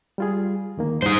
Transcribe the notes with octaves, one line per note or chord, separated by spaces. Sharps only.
G3 F4 G#4
D2 D#3 A#3
G2 D#4 C5